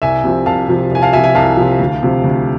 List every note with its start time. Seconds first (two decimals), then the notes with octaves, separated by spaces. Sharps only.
0.02 C2 E5 G#5
0.24 C3 F3
0.46 C2 F5 A5
0.69 C3 F3
0.91 C2 G#5
1.02 F5 A5
1.13 C3 F3 E5 G#5
1.24 E5 G#5
1.35 C2 F5 A5
1.57 C3 F3
1.79 D2
2.03 C3 F3
2.24 D2